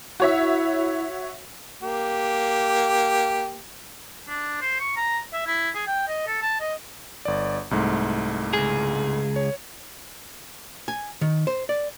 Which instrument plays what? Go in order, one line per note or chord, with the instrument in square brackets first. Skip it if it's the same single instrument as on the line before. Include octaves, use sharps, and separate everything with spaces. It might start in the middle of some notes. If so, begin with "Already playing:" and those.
[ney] E4 [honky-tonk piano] F#4 C#5 E5
[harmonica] A#3 G4
[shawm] D4
C5
C#6
A#5
E5
E4
G#4
G5
D#5
A4
A5
D#5
[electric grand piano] G1 D5
C2 G#2 A3
[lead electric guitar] C#2 G#4
[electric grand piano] C#5
[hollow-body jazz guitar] G#5
D#3
C5
D5